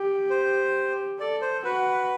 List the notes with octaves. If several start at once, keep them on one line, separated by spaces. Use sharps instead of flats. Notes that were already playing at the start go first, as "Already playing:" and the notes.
Already playing: G4
C5
A4 D5
C5
F#4 B4